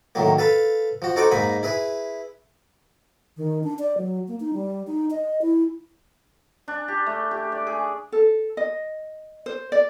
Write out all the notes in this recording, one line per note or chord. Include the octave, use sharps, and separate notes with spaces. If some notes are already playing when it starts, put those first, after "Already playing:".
A2 D#3 F#3 A#3
A4 B4 F5 A5
F3 F#4
D#4 F#4 A4 C5 F#5 D6
G#2 A#3 D#4 G#5 B5
E4 G#4 B4
D#3
D4
D5
F#3
A#3
D#4
G3
D#4
D#5
E4
D4
G4
A3
G4
D5
G#4
A4
D#5
C5
D5